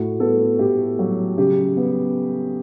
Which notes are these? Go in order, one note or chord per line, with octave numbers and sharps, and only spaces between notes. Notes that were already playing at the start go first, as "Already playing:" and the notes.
Already playing: A2 F#4
B3 A4
A2 G4
F#3
C#3 G4
B3